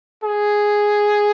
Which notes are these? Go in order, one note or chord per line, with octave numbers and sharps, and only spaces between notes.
G#4